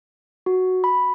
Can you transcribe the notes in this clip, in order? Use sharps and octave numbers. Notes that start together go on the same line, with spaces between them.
F#4
B5